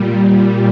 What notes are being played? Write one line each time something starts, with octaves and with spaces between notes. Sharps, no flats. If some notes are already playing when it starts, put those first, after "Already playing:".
Already playing: A#2 G3